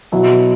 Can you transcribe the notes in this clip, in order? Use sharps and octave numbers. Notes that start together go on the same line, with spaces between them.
B2 F#3 B3 E4